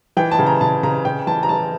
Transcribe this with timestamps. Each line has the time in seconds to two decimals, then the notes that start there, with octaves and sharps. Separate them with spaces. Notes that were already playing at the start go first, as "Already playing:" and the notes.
0.17 E3 G5
0.31 A5
0.39 C#3
0.46 A#5
0.61 C#3 A5
0.83 C#3 A#5
1.05 C#3 G5
1.27 E3 A5
1.43 A#5
1.49 E3 A5